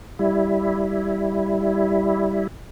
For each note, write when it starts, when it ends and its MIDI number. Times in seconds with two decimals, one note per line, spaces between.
0.19 2.47 55
0.19 2.47 64